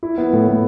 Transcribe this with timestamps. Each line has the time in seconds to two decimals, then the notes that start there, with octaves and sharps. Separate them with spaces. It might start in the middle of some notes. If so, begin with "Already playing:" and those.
0.03 E4
0.18 B3
0.33 A2
0.48 A2